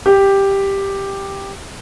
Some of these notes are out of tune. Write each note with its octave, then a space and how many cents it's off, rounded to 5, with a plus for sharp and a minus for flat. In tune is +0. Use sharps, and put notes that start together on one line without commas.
G4 +5